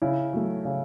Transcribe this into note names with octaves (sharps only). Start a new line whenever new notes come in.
C#3 E4
F#3 A3
C#3